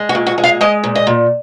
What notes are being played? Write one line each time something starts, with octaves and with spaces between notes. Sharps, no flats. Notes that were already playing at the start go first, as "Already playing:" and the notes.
Already playing: G#3
F#4
A#2
F#4
G#3
F5
G#3 D#5
A#2
D#5
A#2